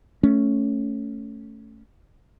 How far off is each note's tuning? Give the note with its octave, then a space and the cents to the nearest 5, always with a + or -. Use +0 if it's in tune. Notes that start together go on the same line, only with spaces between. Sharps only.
A3 +0 C#4 +0